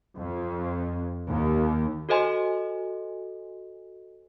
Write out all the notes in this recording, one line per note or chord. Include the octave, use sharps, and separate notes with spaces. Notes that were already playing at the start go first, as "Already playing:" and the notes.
F2
D#2
F#4 A4 C5 D#5 G#5 C6